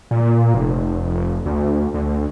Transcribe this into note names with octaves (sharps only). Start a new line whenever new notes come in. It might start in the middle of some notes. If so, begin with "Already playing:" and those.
A#2
F1
D2
D2